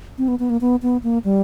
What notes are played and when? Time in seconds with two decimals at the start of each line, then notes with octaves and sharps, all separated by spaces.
0.18 C4
0.28 B3
0.39 B3
0.50 A#3
0.61 B3
0.82 B3
1.03 A#3
1.24 G3